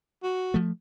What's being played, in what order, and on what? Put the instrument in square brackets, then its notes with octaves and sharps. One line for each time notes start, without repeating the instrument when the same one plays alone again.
[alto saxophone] F#4
[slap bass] F3 A3